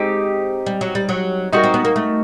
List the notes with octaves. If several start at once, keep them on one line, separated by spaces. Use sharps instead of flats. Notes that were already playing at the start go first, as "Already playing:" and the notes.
Already playing: G#3 C4 D#4 G4
G3
F#3
G3
F#3
G3 D#4 F#4 A#4
C4
B3
A#3
A3